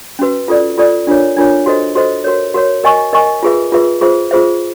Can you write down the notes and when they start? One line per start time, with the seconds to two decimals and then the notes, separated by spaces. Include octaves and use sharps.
0.19 C#4 F#4 B4
0.48 F4 A4 D5
0.78 F4 A4 D5
1.07 D4 F4 A#4 C#5
1.37 D4 F4 A#4 C#5
1.66 F#4 A4 C5 D#5
1.95 F#4 A4 C5 D#5
2.24 F#4 A#4 C#5
2.54 F#4 A#4 C#5
2.84 A#4 D#5 G#5 C#6
3.13 A#4 D#5 G#5 C#6
3.43 F4 G#4 B4 E5
3.72 F4 G#4 B4 E5
4.01 F4 G#4 C5 E5
4.31 F4 G#4 C5 E5